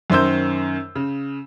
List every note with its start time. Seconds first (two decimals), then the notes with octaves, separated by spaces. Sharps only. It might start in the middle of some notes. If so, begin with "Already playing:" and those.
0.10 F#2 D#3 C5 E6 G6
0.95 C#3